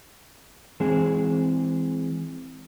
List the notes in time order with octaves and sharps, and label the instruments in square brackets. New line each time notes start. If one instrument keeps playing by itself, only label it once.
[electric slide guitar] E3 G#3 C4 G#4